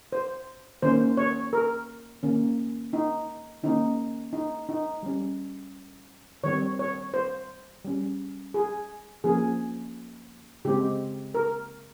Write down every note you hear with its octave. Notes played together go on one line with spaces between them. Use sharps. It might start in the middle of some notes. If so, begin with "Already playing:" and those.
C5
D#3 A#3 C#4 C5
C#5
A#4
D#3 A#3 C#4
D#4
D#3 A#3 C#4 D#4
D#4
D#4
G3 C#4
D#3 G3 C4 C#5
C#5
C5
G3 C#4
G#4
F3 A#3 C#4 G#4
C#3 G#3 C4 G4
A#4